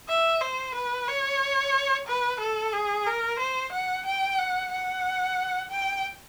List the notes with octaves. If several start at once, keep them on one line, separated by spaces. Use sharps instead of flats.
E5
C5
B4
C#5
B4
A4
G#4
A#4
C5
F#5
G5
F#5
F#5
G5